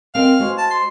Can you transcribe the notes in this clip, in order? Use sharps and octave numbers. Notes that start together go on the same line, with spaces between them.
C4 A#4 D#5 F5
G#3 F#4 C5
A5
C6